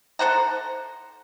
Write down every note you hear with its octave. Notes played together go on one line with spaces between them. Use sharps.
A4 C5 F#5 A#5